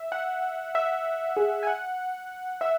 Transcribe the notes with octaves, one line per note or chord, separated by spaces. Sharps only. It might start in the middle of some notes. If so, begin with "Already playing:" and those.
Already playing: E5
F#5
E5
G#4
G#5
F#5
E5